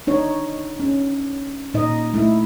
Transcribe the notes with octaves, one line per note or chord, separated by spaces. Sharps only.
D4 D#4 C#5
C#4
A#2 D#4 D#5
A3 E4